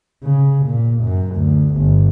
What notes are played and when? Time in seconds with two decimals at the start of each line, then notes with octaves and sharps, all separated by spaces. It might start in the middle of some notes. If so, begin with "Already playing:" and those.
0.23 C#3
0.67 A#2
1.03 F#2
1.36 D2
1.76 G1